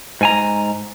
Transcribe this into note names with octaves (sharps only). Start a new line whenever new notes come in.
G#2 G#5 A#5